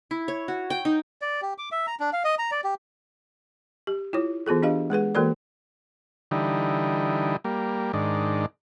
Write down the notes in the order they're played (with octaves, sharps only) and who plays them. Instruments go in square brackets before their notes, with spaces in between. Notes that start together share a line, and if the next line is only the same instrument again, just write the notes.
[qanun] E4
C#5
F#4
G5
D#4
[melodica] D5
G4
D6
E5
A#5
D4
F5
D#5
A#5
D5
G4
[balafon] G4
E4 F4 C#5
E3 B3 F4 G#4 A4
D4 G4 D#5 F5
G#3 G#4 B4 F#5
E3 A#3 F#4 A4 A#4 D5
[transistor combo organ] D3 E3 G3 D#4
G3 A#3
G#2 D#3 D4